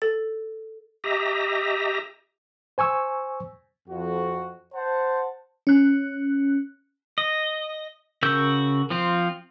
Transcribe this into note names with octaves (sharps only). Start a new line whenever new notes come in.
A4 A6
G4 D#5 E5 A#5
C5 G#5 C#6 E6
F2 F#4
C5 F#5 A5
C#4 F#6
D#5
C#3 F#4 A#4 E6 G6
F3 C4 F4